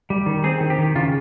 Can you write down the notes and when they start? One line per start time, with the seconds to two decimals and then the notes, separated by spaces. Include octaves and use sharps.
0.10 G3
0.26 D#3
0.44 C4 G#4
0.60 D#3
0.70 G4
0.78 D#3
0.95 C#3 F4